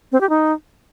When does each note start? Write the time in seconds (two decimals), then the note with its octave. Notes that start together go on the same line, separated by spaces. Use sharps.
0.12 C4
0.21 G4
0.30 D#4